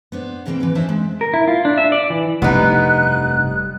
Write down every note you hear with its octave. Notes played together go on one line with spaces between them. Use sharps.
B3 D4 C5
G#2 C#3 E3 A#3 C4 G5
E3 B4
C#4 D4 C5 D#5 E5 A5
G#3
A#4
E4
F4
D4
E5
D5
E3
F1 G2 G3 B3 D#4 F#6